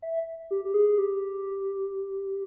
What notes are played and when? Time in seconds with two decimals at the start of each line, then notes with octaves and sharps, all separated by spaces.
0.02 E5
0.51 G4
0.65 G4
0.74 G#4
0.98 G4